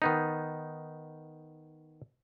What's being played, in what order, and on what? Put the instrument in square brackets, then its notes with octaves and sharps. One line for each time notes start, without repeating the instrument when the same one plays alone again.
[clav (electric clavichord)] D#3 B3 D#4